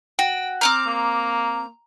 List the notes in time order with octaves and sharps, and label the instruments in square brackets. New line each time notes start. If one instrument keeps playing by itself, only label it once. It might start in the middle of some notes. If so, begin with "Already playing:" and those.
[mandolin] F#4 [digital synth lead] G5
[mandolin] C4 D6 F6 [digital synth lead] A#5
[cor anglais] A#3